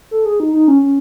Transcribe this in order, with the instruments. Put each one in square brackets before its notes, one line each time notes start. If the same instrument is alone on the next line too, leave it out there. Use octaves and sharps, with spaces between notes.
[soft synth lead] A4
G#4
D#4
D#4
C#4
C#4